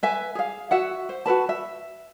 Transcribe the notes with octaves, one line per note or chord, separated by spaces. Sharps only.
B4 E5 G#5
G#4 F5
F#4 E5 F#5
C5
F#4 A#4 B4 A5
E5